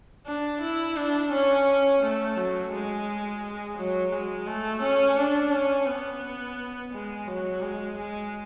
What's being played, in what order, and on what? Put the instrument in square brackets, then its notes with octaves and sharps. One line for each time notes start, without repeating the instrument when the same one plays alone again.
[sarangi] D4
E4
D4
C#4
A3
F#3
G#3
F#3
G#3
A3
C#4
D4
C#4
B3
G#3
F#3
G#3
G#3